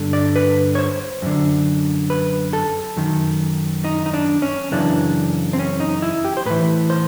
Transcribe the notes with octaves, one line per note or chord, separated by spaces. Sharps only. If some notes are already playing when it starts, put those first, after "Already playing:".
Already playing: G2 D3
D5
B4
C#5
C5
F#2 D3
B4
A4
F#2 D#3
D#4
D#4
D4
C#4
F#2 C#3 E3 D4
C4
C#4
D#4
E4
G4
C5
A2 E3 B4
C5